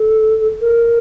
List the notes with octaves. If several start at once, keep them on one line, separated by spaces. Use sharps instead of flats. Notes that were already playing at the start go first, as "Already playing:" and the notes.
Already playing: A4
A#4